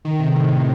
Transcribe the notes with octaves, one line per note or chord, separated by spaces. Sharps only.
D#3
C3
A2